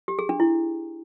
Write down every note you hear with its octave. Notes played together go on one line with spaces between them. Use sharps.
G4
G#4
D4
E4